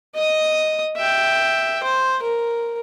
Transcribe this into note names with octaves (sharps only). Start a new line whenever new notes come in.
D#5 D#6
E5 G5
C5
A#4